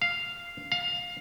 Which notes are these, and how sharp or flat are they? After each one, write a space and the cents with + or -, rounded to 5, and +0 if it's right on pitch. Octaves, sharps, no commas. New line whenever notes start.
F5 -5
F5 +15